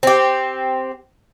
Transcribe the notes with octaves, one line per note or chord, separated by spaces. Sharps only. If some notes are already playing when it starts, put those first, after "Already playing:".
C4 G4